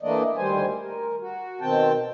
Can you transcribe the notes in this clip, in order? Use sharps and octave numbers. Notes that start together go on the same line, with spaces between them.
E3 A3 A#3 D4 D5 D#5
D2 D#3 G3 C5 G#5
A#4
F#4
B2 D#3 C4 G5 A5